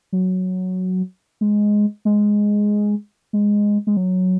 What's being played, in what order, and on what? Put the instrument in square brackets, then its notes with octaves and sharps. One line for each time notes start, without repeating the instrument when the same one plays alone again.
[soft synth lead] F#3
G#3
G#3
G#3
G#3
F#3